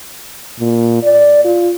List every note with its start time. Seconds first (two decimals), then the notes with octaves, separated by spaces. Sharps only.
0.60 A#2
1.03 D5
1.45 F4